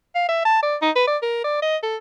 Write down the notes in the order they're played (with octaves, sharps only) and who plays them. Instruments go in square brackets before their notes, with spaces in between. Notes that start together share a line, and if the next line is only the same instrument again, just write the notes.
[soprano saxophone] F5
E5
A5
D5
D#4
B4
D5
A#4
D5
D#5
A4